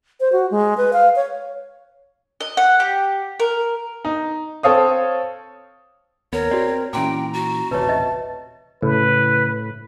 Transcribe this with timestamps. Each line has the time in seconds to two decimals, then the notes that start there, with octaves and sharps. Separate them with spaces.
0.20 C5
0.32 F#4
0.51 G#3
0.77 B4
0.93 F5
1.16 C#5
2.41 D#5
2.57 F#5
2.80 G4
3.40 A#4
4.05 D#4
4.63 C4 A4 C#5 F5 D#6
6.33 D#2 B3 A#4 C#5
6.51 C4 F#4 D5
6.93 A#2 E3 C#4 G5 A#5 C6 D6
7.33 F#4
7.71 D#1 A1 C3 B4 C#5 A5
7.89 B4 D#5 E5
8.82 A2 C#3 A4 B4